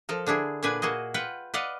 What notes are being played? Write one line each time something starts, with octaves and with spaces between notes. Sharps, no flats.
F3 A4 A#4
D3 D4 E4 G#4
A#2 D3 D4 B4 D5 G#5
A#3 F#4 G#4 D#5
F4 B4 F#5 G5
B4 D5 D#5 F5 F#5